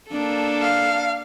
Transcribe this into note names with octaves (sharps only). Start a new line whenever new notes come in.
A#3 D4 A4
F5